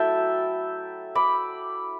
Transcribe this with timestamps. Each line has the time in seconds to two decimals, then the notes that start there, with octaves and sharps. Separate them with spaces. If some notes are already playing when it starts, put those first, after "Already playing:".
Already playing: F#3 A3 E4 E5 G5 A5
1.15 B5 D6